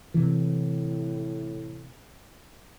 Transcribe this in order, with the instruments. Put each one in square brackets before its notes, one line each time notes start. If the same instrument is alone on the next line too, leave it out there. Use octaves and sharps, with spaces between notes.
[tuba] A2 [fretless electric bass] C3 E3